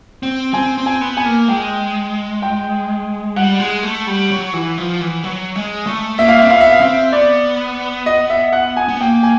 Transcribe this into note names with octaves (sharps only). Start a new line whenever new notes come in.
C4
C4 G#5
C4
G#5
B3
G#5
A#3
G#3 G5
G5
G3 F#5
G#3
A3
G3
F#3
E3
F3
E3
F#3
G#3
A3
A#3 E5
F5
C4 E5
B3 F5
E5
F5
C4 E5
B3 D5
D#5
E5
F#5
G#5
B3
A#3 G5
G#5